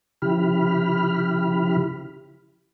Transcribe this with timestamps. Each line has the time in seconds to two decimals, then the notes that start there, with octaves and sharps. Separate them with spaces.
0.22 C#3 F3 E4 G4 B5 F6